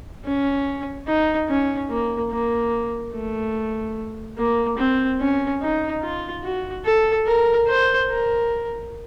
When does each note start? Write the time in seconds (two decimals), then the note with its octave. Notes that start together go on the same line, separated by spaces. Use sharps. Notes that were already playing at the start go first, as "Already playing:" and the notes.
0.25 C#4
1.07 D#4
1.48 C#4
1.90 A#3
2.31 A#3
3.13 A3
4.38 A#3
4.78 C4
5.20 C#4
5.62 D#4
6.02 F4
6.43 F#4
6.85 A4
7.27 A#4
7.67 C5
8.09 A#4